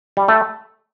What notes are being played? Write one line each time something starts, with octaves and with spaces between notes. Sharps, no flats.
G3
A3